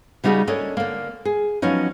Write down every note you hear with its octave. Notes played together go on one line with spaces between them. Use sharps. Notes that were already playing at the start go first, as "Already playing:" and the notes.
C#3 G3 D#4 F#4 G#4
A#3 C#4 D4 A4 C#5 D#5
D3 A#3
G#4
F3 F#3 B3 C#4 D#4